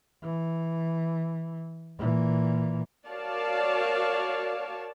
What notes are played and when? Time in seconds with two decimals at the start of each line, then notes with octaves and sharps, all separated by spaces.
0.23 E3
1.98 A#2 E3
3.07 F#4 A#4 C#5 D5 F5 A5